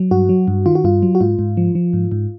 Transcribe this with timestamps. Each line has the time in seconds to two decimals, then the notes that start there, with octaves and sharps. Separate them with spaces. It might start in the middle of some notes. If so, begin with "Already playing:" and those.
Already playing: F#3
0.11 G2 F#4
0.29 F#3
0.48 G2
0.66 D#3 F4
0.75 F#4
0.84 G2 F4
1.02 F#3
1.15 F#4
1.21 G#2 F4
1.39 G#2
1.57 F3
1.75 F3
1.93 G#2
2.12 G#2